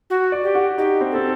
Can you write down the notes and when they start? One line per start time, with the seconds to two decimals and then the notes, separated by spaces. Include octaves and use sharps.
0.10 F#4
0.32 D5
0.43 G4
0.55 F#4
0.78 D#4 G4
1.01 C4
1.11 C4 A4